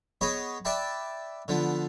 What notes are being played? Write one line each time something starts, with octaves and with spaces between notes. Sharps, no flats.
B3 G#4 C#5 D#5 B5
B4 D5 E5 G5 A5 B5
D3 F3 B3